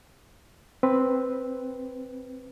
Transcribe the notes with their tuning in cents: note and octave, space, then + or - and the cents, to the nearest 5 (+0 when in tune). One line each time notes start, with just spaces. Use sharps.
C4 +0 B4 +0